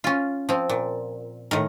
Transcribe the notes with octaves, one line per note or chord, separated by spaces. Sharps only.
C#4 F4
F3 C4
A#2
A2 D#3 A#4